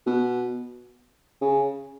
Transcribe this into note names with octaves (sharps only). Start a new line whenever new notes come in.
B2
C#3